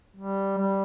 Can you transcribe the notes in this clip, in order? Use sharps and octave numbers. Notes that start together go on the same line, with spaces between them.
G3
G3